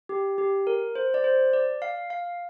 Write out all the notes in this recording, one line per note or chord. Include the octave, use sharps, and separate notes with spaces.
G4
G4
A#4
C5
D5
C5
D5
F5
F5